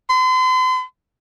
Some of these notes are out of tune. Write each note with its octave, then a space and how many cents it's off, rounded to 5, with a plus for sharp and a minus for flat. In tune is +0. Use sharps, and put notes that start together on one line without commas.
C6 -40